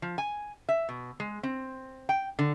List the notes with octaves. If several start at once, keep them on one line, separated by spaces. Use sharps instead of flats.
F3
G#5
E5
B2
G#3
C4
G5
D3